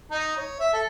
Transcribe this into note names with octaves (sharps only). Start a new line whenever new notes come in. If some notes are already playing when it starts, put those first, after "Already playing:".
D#4
C#5
E5
A4